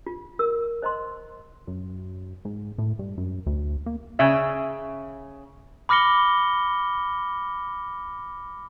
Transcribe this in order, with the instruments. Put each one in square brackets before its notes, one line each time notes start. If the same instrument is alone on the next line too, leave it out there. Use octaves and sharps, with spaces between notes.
[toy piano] F4
A#4 E6
C5 D#5 A#5 C6
[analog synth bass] F#2
G#2
A2
G2
F#2
D2
A#3
[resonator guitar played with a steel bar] C#3 E5
[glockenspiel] B5 D6 F6 A#6 C#7 G7